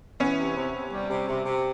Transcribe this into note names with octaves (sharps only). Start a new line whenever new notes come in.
E3 B3 C#4
C3
C3
C3
G3
C3
C3
C3